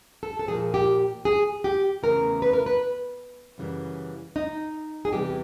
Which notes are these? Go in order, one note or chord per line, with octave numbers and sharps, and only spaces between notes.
A4
A4
A#2 F3 A#3 G#4
G4
G#4
G4
E2 C#3 E3 A3 A#4
B4
A#4
B4
F#2 C#3 E3 G3
D#4
G#4
E2 C3 E3 G3 G4